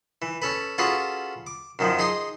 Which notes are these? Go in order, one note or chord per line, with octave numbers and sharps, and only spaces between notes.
E3
C#4 A4 B4
C#4 F4 F#4 G#4 A4 B4
D6
F#2 D#3 F3
D#4 G#4 C6 D#6